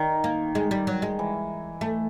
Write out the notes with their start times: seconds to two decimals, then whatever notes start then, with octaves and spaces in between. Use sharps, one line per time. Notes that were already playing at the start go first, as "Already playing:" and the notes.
Already playing: D#3
0.24 A#3
0.55 G#3
0.71 G3
0.87 F#3
1.02 G#3
1.19 E3
1.81 A3